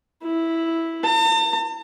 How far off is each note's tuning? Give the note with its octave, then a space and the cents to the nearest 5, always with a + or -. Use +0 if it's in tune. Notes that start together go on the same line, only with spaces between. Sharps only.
E4 -5
A5 +45